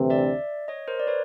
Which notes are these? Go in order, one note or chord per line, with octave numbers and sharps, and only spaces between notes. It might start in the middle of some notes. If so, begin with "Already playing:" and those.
Already playing: D2 C3 E3
D5 E5
C#5 D#5
A#4 C5
D5
B4 C#5